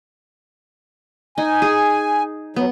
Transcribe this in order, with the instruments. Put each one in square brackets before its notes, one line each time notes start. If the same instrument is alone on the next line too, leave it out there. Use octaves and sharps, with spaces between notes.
[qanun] D#4 [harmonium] G#5
[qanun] G#4
[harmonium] F#3 [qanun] B3